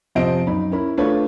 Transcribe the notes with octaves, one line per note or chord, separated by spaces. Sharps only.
F2 C3 F3 C5 D#5 D7
F#2 D#4 B5
C#4 E4 A#4 B5
A3 D4 F4 A4 B4 C#5